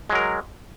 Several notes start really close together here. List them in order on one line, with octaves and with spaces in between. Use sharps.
G#3 F#3 A#4